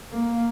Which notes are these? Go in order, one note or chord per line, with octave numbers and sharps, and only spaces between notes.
A#3